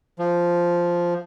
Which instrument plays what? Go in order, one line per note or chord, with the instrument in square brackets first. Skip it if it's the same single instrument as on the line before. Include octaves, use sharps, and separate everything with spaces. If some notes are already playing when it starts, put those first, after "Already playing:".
[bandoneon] F3